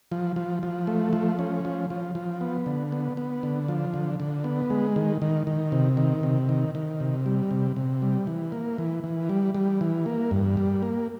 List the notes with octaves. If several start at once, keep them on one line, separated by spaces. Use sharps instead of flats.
F3
F3
F3
A3
F3
C#4
F3
F3
F3
B3
D3
B3
B3
D3
F3
D3
D3
B3
G#3
D#3
D#3
D#3
C3
D#3
C3
D#3
D#3
C3
G3
C3
C3
G3
E3
A#3
E3
E3
G3
G3
E3
A#3
G2
G3
A#3